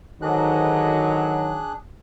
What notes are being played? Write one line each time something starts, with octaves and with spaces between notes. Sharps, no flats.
G#2 D3 D#3 F#3 D4 G#4 D#5 F#6